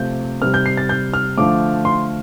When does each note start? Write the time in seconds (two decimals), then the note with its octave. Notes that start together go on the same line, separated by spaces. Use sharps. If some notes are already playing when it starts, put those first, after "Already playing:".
Already playing: C3 F3 A3 G6
0.42 C3 G3 F6
0.54 G6
0.66 C7
0.77 A6
0.89 G6
1.14 F6
1.38 D3 F3 A3 D6
1.85 C6